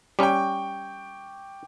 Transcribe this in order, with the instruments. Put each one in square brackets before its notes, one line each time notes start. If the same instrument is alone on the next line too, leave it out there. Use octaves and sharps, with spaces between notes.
[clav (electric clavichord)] G3 C#4 [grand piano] G5 C#6 D6